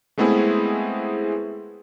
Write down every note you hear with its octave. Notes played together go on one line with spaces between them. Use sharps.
G#3 A3 B3 C4 E4 G#4